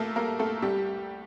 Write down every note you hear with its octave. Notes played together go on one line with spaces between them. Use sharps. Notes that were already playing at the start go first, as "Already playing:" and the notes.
Already playing: A2 A3 A#3 A4 A#4
G3 A#3 A#4
A3 A4
C2 G3 G4